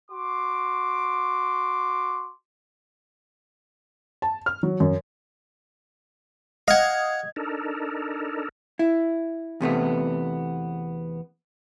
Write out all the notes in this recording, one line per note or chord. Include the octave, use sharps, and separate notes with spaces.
F#4 C6 D6
A5
F6
F#3
F#2
D#5 F5 F#5 G#6
D4 D#4 A4 A#4
E4
E2 C3 A3 B3